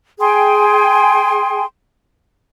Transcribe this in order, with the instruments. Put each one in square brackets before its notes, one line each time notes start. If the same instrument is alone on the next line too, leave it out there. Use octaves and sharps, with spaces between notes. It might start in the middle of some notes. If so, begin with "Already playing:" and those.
[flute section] G#4 G5 G#5 C6